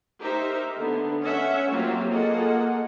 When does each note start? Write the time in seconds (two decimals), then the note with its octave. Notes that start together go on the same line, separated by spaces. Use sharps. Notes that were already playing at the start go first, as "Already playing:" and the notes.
0.20 D#4 G4 A#4 C5 E5
0.77 D3 B3
1.23 C#4 E5 F#5
1.71 F#3 A#3 C4 F4 G4
2.09 A#3 F4 G#4 A4 D#5 F#5